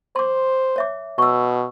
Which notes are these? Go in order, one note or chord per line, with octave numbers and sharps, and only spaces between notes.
C5 C6 D6
C#5 E5 D6
B2 C#6 E6